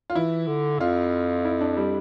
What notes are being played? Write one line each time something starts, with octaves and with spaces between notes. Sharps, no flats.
F4
E3 E4
D3
F2 F4
E4
D4
G3